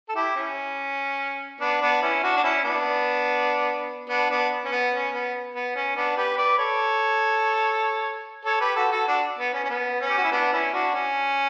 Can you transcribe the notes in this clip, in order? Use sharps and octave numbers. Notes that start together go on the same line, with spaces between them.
A4
E4 G4
C#4
B3 D4
B3 D4
C#4 E4
D4 F#4
D4
C#4 E4
B3 D4
B3 D4
B3 D4
C#4
B3
C#4
B3
B3
C#4
B3 D4
G4 B4
B4 D5
A4 C#5
A4 C#5
G4 B4
F#4 A4
F#4 A4
D4 F#4
B3
C#4
C#4
B3
C#4
G4
F#4
E4
B3 D4
C#4 E4
D4 F#4
C#4